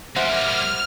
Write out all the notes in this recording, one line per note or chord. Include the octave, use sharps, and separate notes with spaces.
G3 A#3 C5 E5 F#5 F6